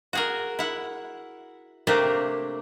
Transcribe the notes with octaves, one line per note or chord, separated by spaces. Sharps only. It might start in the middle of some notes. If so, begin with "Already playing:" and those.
F#4 G#4 A#4
E4 F#5
C3 A3 A#3 C4 D4 G4